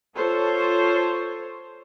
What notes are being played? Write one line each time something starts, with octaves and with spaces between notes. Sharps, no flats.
F4 A4 C5 C#5